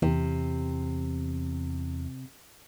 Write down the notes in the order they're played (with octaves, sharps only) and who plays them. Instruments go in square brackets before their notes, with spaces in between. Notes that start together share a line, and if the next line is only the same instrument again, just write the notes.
[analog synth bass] E2 [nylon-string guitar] C3